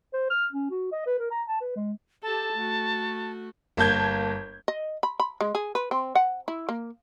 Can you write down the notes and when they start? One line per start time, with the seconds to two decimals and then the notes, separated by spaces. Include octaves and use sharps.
0.13 C5
0.30 F6
0.52 C#4
0.71 F#4
0.92 D#5
1.07 B4
1.19 A#4
1.31 A#5
1.48 A5
1.61 B4
1.76 G#3
2.23 G4 A4 A5
2.53 A3 F#4
3.77 G1 A#3 A5 G6 G#6
4.68 D#5
5.03 B5
5.20 B5
5.41 G#3
5.55 G#4
5.75 B4
5.91 C4
6.15 F#5
6.48 E4
6.69 A#3